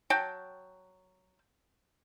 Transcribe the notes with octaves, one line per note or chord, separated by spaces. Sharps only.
F#3 G5 A5